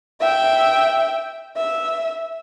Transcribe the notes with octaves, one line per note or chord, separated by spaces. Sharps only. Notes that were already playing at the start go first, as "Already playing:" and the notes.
E5 G5
E5